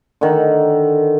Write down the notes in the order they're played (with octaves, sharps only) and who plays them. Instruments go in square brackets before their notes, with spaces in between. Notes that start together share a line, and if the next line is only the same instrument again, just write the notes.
[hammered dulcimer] D3 D#3